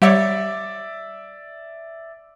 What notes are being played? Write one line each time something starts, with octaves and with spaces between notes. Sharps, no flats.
G3 C#5 D5 E5 D6